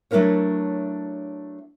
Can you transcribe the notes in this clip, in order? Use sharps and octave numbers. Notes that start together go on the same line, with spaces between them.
F#3 A3 D4 E4 A#4 C#5